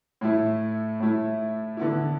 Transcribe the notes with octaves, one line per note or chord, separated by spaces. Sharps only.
A2 A3 E4
A2 A3 E4
D3 B3 E4